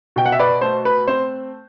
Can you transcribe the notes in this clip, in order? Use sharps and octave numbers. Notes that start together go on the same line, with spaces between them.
B2 G5
F#5
E5
B4 D5
A3 C5
B4
C4 C5